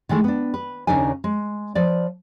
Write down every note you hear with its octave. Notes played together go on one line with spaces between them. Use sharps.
D#3 E3 G#3 A3
B3 D4
B4
D#2 C#3 D4 D#4 A#4 G#5
G#3
F3 B4 D5